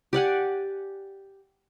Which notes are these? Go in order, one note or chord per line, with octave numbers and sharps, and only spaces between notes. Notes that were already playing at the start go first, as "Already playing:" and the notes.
G4 D5 F#5 G#5